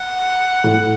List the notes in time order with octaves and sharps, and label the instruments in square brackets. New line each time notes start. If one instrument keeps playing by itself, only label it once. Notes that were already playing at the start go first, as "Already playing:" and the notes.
Already playing: [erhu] F#5
[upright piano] A2